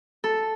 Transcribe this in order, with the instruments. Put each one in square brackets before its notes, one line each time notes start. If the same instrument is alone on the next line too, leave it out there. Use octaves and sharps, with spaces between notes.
[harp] A4